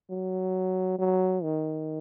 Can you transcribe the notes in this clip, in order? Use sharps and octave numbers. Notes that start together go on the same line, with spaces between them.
F#3
F#3
D#3